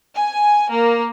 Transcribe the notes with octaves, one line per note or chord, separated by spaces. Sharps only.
G#5
A#3